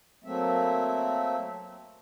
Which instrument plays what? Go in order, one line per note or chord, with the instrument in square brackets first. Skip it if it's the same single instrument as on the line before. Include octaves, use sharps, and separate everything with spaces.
[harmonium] F#3 A3 A#3 C4 E5